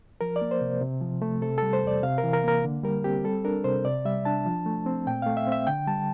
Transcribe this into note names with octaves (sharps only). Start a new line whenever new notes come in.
F3 A#4
D5
A#3
C5
C3
C3
F3
A3
C3 A4
G3 A4
C5
E2 D5
C3 F5
A#4
E3
A#4
A#3 A#4
D3
G3 A#4
C4 G4
G3 A4
D4 A#4
C3 C5
C3 D5
G3 E5
D4 A5
F3
A3
C4
A#2 G5
A3 F5
E5
C4 E5
D3 G5
G3 A5